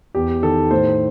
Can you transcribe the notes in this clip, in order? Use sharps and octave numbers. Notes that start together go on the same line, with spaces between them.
E2 G4
D#3 A4
A2 C5